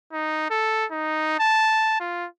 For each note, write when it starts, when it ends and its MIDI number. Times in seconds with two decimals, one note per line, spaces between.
0.12 0.48 63
0.50 0.86 69
0.92 1.39 63
1.40 1.97 81
2.00 2.27 65